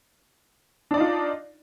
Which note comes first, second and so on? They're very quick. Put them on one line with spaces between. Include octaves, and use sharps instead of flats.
D4 D5 D#4 F4